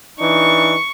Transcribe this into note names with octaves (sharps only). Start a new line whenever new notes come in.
E3 D4 D#4 C#6